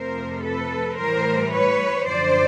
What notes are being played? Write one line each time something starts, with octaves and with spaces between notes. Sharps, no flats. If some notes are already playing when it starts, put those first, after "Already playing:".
Already playing: F2 C3 F3 A3 A#4 C5
A4 B4
A2 E3 G3 A#4 C5
B4 C#5
F#2 D3 F3 C5 D5